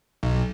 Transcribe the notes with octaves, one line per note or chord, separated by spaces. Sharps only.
B1